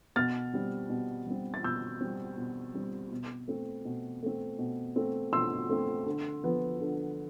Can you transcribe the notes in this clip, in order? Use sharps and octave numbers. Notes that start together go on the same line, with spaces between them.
B2 F6 A6
G3 C4
B2
G3 C4
A6
B2 E6 G6
G3 C4
B2
G3 C4
B2
A3 C4
B2
A3 C4
B2
A3 C4
B2 C6 E6
A3 C4
D3
F3 B3
D3